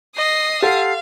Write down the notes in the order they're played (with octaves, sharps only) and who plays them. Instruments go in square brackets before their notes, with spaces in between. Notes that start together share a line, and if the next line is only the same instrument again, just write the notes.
[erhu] D#5 [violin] D#6 C7
[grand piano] G4 A4 [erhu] F5 [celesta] F#5 C6 A6